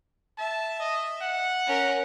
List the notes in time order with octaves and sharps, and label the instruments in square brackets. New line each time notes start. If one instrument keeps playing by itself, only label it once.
[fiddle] E5 [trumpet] A5
[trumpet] D#5
F#5
[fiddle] C#4 A#4